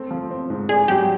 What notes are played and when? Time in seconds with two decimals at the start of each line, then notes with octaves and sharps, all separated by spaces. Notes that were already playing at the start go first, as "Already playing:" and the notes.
Already playing: A3 C4
0.11 F3
0.31 C4
0.50 G#2
0.69 D4 G#4
0.88 F#3 G4